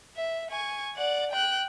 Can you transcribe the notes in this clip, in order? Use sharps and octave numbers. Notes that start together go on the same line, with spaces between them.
E5
G#5 C#6
D5 F#5
G5 F#6